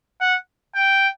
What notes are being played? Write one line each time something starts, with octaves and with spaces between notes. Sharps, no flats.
F#5
G5